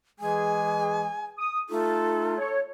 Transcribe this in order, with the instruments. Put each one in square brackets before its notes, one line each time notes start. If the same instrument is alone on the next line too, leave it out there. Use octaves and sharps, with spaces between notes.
[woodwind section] E3 G#3 G#4 [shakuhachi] G#5
[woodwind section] D#6
[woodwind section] A3 D#4 F4 [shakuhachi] A4
[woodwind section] C#5